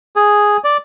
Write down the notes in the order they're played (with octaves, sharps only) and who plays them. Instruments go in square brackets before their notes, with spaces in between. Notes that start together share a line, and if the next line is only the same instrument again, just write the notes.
[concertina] G#4
D5